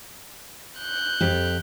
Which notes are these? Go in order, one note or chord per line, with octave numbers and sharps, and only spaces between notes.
F#6 G6
F2 G4